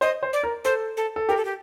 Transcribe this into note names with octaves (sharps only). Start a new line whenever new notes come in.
C5 D#5
C5
D5
A#4
A4 C5
A4
A4
G4 A#4
A4
G4